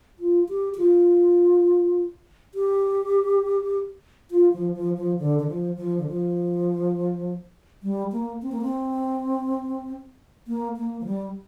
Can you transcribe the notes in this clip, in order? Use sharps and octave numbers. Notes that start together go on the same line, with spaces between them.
F4
G4
G4
F4
G4
F4
F3
F3
F3
D3
D3
F3
F3
D3
F3
G3
A#3
C4
A#3
C4
A#3
A#3
F3
G3